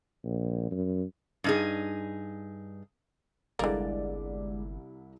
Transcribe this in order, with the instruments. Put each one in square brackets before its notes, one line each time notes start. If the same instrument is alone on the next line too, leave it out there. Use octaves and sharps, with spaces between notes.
[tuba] A#1
F#2
[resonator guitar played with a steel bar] G2 D#4 G#4
[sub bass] G1 [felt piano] C2 G3 E4 [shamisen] D3 A#3 [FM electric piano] G#3 D5